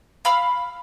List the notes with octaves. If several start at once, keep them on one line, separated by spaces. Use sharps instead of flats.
F5 B5 E6